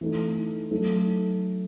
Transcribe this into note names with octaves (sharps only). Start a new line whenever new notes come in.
E3 A3 D#4
F#3 A3 D#4 A4